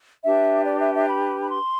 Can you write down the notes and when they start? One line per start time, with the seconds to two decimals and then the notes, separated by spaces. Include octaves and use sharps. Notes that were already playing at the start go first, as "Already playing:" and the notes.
0.23 D4 G4 B4 E5
0.66 D5
0.79 E5
0.94 E5
1.08 B5
1.41 B5
1.49 C6